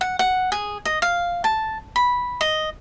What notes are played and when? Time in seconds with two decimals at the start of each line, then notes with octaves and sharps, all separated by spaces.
0.01 F#5
0.19 F#5
0.52 G#4
0.85 D#5
1.02 F5
1.44 A5
1.96 B5
2.41 D#5